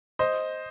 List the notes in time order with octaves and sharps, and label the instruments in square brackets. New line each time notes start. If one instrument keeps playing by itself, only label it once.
[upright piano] C5 D#5